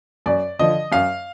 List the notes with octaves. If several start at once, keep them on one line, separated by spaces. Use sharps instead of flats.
F#2 D5
D3 F3 D#5
F#2 F5